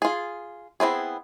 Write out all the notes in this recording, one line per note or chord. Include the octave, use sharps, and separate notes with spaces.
F4 G#4
B3 C4 E4 G#4